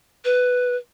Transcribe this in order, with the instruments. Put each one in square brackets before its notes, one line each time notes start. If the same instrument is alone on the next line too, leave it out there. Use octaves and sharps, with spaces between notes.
[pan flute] B4